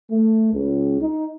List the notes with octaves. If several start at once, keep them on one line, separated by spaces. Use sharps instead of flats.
A3
C#2
D#4